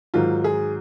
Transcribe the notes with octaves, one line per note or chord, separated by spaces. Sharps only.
G#2 D#3 F#3 F4
G#4